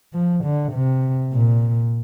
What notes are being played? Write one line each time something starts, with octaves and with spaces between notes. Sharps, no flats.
F3
D3
C3
A#2